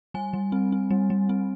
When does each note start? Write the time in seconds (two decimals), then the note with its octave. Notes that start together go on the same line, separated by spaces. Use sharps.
0.14 G3 G#5
0.33 G3
0.52 C4
0.72 C4
0.90 G3
1.10 G3
1.29 C4